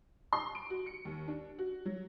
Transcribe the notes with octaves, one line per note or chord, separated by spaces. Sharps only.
C6
D7
F#4
C#7
D#2
D4
F#4
F#3